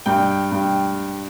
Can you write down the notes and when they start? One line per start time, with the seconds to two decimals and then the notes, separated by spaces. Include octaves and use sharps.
0.06 G2 G5
0.52 G2